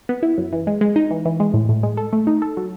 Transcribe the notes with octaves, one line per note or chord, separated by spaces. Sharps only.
B3
E4
F#2
E3
G#3
G#3
D#4
E3
E3
G#3
A2
A2
G#3
A4
A3
D#4
A4
F#3